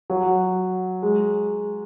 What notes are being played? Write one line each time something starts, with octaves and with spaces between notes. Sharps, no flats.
F#3
G#3